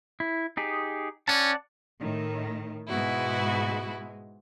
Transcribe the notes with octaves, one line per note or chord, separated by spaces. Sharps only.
E4
D#4 G4 G#4
C#4 D5 F#5 A5
A2 D#3
G#2 B2 G#3 B3 E4 F#4